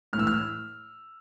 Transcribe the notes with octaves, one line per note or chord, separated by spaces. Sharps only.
A2 E3 E6 F6
F6